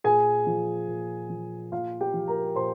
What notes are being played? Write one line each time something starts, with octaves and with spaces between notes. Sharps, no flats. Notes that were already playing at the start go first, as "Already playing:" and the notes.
A#2 G#4 G#5
F3
A#2
F3
A#2 F4 F5
G4 G5
F3
A#4 A#5
A#2 C5 C6